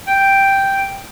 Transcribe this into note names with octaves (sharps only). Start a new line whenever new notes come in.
G5